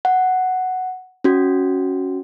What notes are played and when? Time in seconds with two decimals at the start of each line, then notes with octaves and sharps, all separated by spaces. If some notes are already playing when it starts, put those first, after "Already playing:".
0.05 F#5
1.24 C#4 F#4